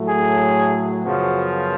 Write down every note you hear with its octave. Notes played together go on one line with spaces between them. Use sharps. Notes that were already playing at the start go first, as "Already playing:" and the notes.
Already playing: A2 F#3 A3
G#4
F#2 C#3 F3 B3 F#4